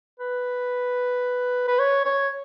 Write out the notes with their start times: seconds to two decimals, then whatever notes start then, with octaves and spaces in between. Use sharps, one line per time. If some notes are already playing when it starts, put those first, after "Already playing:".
0.20 B4
1.68 B4
1.79 C#5
2.05 C#5